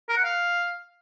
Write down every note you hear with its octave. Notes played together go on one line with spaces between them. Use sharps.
A#4
F#5
F5